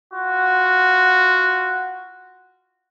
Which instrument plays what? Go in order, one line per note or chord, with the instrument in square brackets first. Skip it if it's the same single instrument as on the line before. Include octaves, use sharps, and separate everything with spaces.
[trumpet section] F4 F#4